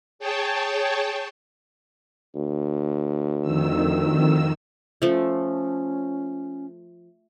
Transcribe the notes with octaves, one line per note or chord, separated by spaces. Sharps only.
G#4 C#5 G5 A5
D2
F2 D#3 E6
F3 A3 C#4